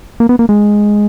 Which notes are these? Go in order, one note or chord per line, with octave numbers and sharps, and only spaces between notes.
A#3
B3
A#3
G#3